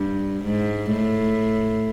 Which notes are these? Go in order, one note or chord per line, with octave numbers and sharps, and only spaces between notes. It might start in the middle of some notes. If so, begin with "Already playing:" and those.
Already playing: G2
G#2
A2